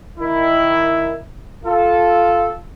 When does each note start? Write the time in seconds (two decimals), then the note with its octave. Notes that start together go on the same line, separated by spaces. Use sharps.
0.19 D#3 E4
1.65 F4 A4